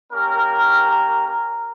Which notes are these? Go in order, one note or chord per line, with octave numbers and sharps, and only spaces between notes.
A#3 C#4 G4 A#4
A#4
A#4